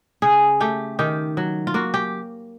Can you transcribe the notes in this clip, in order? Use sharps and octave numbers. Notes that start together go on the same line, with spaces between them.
C#3 G#4
A3 G4
D#3 G4
F#3
F4
A#3 F#4
G4